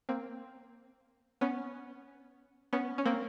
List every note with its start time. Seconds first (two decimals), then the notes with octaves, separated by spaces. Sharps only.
0.09 A#3 C4
1.41 B3 C#4
2.73 B3 C#4
2.98 C#4
3.06 A#3 C4